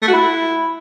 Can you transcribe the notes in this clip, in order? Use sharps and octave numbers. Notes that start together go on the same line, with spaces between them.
A3
F#4
E4